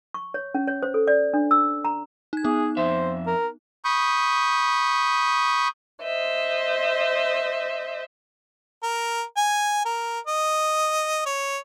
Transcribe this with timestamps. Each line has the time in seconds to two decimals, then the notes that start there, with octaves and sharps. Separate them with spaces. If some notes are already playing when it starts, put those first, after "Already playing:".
0.14 C#6
0.34 C#5
0.55 C#4
0.68 C#5
0.83 C5
0.94 A4
1.07 D5
1.34 D4
1.51 E6
1.85 A#5
2.33 D#4 G#6
2.44 B3 D#4 G#4
2.77 F2 C5 E5
3.27 A#4
3.85 B5 C#6 D#6 G6
6.02 C5 D#5 E5
8.83 A#4
9.37 G#5
9.85 A#4
10.27 D#5
11.26 C#5